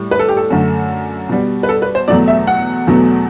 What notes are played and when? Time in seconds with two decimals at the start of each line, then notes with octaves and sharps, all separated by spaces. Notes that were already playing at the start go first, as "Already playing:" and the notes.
Already playing: A2 G3
0.11 B4
0.19 A4
0.28 G4
0.37 A4
0.50 F#2 D3 A3
1.29 B2 G3
1.63 B4
1.69 A4
1.82 B4
1.95 C5
2.08 E2 B2 F#3 A3 D5
2.28 E5
2.47 F#5
2.87 E2 B2 F#3 A3